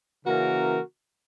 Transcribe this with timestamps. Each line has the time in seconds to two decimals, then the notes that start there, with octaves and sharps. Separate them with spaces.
0.24 C#3 E3 A#3 C#4 F#4 A#4